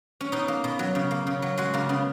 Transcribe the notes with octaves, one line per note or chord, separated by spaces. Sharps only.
C#4
B2 D#4
A#3
B2
F#3
C#3
A#3
C#3
F#3
G#3 F#4
C#3 A#3
C#3 B3